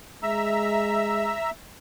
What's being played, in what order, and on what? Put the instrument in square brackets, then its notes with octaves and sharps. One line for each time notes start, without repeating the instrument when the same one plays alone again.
[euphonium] G#3 [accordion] E5 A#5 E6